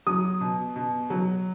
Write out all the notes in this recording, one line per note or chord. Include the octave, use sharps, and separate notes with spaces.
F#3 D#6
B2
B2
F#3